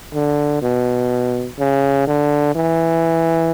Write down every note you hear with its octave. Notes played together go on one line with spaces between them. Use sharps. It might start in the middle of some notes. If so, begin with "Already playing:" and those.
D3
B2
C#3
D3
E3